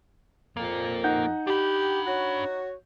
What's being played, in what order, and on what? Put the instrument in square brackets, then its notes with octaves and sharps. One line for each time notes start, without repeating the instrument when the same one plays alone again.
[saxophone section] F2 F3 [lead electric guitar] A#2 A#3
[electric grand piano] D#4 F#5 G6
[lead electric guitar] D4 B5 [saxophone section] G4
[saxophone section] F#4 C#5